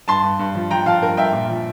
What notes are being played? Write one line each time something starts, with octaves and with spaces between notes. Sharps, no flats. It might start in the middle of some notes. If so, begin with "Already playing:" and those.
G2 A5 C6
G2
G2
F3
F3 G5 A#5
F3 F5 A5
G2 A#4
G2 E5 G5
A#2
F3